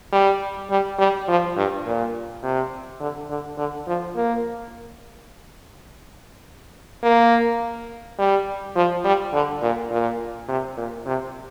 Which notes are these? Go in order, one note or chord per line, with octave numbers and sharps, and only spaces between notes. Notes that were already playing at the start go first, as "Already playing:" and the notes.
G3
G3
G3
F3
G2
A#2
C3
D3
D3
D3
F3
A#3
A#3
G3
F3
G3
D3
A#2
A#2
C3
A#2
C3